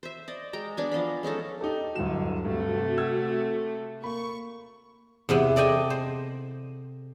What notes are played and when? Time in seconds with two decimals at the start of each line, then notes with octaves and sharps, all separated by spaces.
0.03 C5 E5
0.28 D5 D#5
0.53 G#3 G5 A#5
0.77 B3 D4 G#5
0.92 F3 D#5 F5 B5
1.23 G#3 C#4 D#4 A4
1.61 D#4 G4 A4
1.96 D1 G2 D3 F#4 E7
2.45 G2 C3 A3
2.98 E6 G#6
4.04 A#3 B5 C#6
5.29 E2 C3 B3 E4
5.56 A4 D5 D#5 G5 G#5
5.90 C5